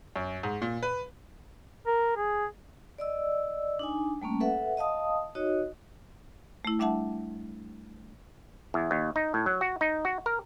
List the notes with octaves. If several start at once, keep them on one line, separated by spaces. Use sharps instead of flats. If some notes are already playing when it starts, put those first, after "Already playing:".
F#2
G#2
A#2
B4
A#4
G#4
D5 D#5 E6
D4 D#4 G#5
G3 A3 A#3 C#4
A4 B4 E5 F#5
D#5 F5 A5 D#6
D#4 F#4 C#5 D#5
A3 E4
G3 D4 E5 F#5 A5
E2
D#2
D#4
A2
F#3
F#4
D#4
F#4
A#4